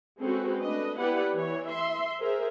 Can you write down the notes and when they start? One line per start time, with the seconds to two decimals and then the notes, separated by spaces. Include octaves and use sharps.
0.19 G#3 C4 C#4 F#4 A4 B4
0.63 A3 D4 B4 D#5
0.98 B3 E4 G4 B4 D5 F#5
1.34 E3 C#5
1.67 E5 C6
2.20 G#4 A#4 C5 E5